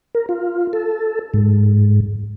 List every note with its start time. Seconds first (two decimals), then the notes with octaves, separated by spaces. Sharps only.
0.15 A#4
0.29 F4
0.73 A4
1.34 G#2